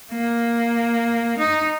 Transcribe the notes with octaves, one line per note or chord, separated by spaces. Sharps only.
A#3
D#4